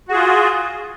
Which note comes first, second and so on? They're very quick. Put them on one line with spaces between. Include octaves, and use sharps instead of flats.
F#4 G#4 F4